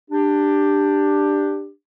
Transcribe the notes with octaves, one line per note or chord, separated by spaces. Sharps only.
D4 G4